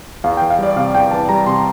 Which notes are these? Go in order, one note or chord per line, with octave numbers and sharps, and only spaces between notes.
E2 F5
E3 G5
F5
G3 D5
C3 F5
E2 G5
E3 A5
G3 A#5
C3 C6